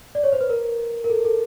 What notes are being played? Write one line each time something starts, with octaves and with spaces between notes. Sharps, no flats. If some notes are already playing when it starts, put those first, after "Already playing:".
D5
C#5
C5
B4
A#4
A#4
A4
A4